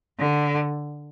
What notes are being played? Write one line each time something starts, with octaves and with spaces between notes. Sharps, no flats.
D3